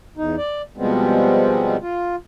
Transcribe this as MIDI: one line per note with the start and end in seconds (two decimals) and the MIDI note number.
0.17 0.36 40
0.17 0.36 63
0.38 0.62 74
0.77 1.76 47
0.77 1.76 53
0.77 1.76 55
0.77 1.76 56
0.77 1.76 59
0.77 1.76 60
1.82 2.16 65